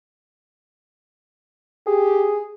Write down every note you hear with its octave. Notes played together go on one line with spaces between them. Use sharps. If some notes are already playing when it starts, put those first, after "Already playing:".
G4 G#4